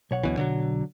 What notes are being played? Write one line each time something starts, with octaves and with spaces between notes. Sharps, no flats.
B1 C#5 F#5
D2 B2 E3
D3 D#3 F#3